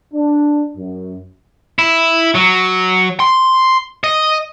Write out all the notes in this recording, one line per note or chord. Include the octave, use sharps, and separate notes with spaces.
D4
F#2
E4
F#3
C6
D#5